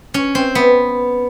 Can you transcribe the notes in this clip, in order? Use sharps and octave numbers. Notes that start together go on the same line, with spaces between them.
C#4
C4
B3